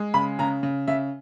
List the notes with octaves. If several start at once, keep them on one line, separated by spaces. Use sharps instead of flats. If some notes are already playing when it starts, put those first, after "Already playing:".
Already playing: G#3
C#3 B5
C#3 A#5
C#3
C#3 E5